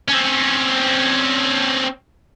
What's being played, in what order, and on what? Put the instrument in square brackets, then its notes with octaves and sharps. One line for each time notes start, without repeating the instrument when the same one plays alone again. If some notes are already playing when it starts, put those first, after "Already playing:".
[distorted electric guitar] C4 C#4